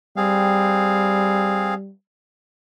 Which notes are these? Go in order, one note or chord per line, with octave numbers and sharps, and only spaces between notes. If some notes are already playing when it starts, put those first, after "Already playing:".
G3 C4 G#4 F5